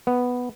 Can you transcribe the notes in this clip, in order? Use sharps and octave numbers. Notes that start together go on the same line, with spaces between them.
B3